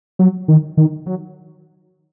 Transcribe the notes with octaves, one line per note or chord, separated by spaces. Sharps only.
F#3
D#3
D#3
F#3